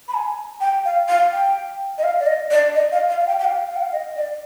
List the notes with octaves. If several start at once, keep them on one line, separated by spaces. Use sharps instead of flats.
B5
G#5
G5
F5
F5
G5
D#5
F5
D5
D#5
D5
D#5
F5
F5
F5
G5
G5
F5
F5
G5
F5
D#5
D5